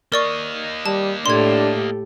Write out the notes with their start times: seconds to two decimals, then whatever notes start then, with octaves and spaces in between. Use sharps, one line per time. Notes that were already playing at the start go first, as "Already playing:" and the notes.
0.12 A#3 A#4 D5 D#5 C#6
0.86 G3 A5
1.26 A2 D4 G4 A4 C6 G#6